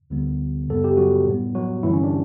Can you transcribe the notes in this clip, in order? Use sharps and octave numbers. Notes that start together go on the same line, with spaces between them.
D2 D3 G3 B3
F#2 C#3 G3 B3 A4
G4
F#3 F#4
A2 G3 B3
F#3 F#4
G2 D3 E3 G3 E4
C#4
D4